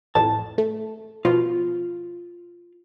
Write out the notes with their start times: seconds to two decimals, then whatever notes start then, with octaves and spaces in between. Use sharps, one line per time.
0.15 A1 F2 A2 A5
0.58 A3
1.25 B2 F3 F4